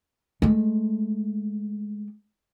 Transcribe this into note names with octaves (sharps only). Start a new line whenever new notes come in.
G#3 A3